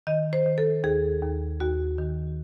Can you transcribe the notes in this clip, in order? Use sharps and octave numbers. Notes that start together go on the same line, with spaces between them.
D#3 D#5
C5
D#3
A4
D#2 G#4
D#2
D#2 F#4
D#3